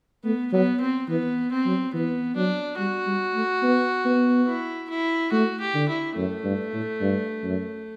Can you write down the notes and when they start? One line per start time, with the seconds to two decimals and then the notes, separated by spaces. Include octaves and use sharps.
0.24 A3 B3
0.52 F#3 B3
0.81 C4
1.09 E3 B3
1.52 C4
1.66 F#3
1.93 E3 B3
2.36 F#3 D4
2.78 G3 F#4
3.07 G3
3.35 A3
3.63 B3
4.05 B3
4.47 E4
4.90 E4
5.32 A3 F#4
5.60 G4
5.74 D3
5.88 E4
6.17 F#2 A3
6.45 G2
6.73 A2
7.01 G2
7.43 F#2